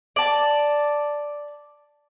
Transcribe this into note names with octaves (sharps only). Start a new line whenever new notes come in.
D5 A5